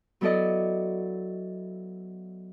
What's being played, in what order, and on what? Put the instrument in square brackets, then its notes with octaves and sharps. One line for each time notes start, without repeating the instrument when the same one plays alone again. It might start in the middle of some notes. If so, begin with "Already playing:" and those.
[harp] F#3 B3 E4 A4 D5 D#5